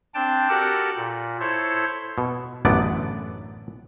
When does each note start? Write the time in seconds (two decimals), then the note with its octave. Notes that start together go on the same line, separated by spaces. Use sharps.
0.14 C4 D4 G5 A5
0.49 F#4 G4 A4 A#4 D5 F#5
0.96 A#2
1.40 E4 A4 C5 C#5
2.18 B2
2.65 A1 F#2 D3 B3 D5